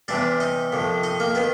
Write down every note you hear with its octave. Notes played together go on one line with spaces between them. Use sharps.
E2 C3 E3 G3 D4 D5
D#4 D#5
F2 C3 D#3
D#4 D#5
A#3 A#4
D#3 B3 B4